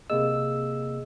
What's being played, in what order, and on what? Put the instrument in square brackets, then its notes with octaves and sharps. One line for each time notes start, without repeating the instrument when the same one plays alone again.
[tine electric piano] C3 A#3 E6 [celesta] G#4 D#5